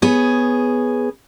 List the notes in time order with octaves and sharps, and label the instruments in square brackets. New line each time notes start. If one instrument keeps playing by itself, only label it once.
[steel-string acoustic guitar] B3 G#4 C#5